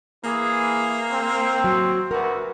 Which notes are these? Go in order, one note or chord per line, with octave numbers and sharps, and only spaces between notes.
E3 A#3 G#4
C4
F#3
D2 F#4 A#4 B4